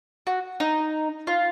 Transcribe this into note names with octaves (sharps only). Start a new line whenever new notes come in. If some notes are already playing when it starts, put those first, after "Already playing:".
F#4
D#4
F4